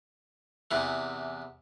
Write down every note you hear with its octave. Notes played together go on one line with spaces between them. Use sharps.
E2 C3 E3